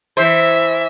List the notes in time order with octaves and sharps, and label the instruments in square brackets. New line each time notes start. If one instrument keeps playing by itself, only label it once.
[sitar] E3 C5 [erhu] E5